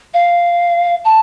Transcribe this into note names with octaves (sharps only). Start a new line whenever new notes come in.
F5
A5